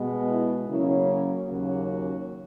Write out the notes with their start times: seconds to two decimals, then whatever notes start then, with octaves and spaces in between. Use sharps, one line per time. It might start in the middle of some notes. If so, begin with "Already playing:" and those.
Already playing: B2 G#3 B3
0.29 E4
0.69 C#3 F#3 A#3 C#4 E4
1.48 D#2 C#3 F#3 A#3 C#4 F#4